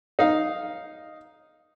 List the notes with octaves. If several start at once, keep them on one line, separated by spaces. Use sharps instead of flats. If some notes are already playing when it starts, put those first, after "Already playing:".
D#4 F5